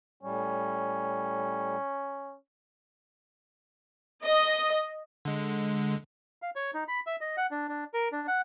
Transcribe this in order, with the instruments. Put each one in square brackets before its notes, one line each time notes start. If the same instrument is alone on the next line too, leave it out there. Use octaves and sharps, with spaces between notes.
[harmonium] A2 G3 [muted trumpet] C#4
[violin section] D#5
[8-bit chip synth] D3 G#3
[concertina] F5
C#5
D#4
B5
E5
D#5
F#5
D4
D4
A#4
D4
F#5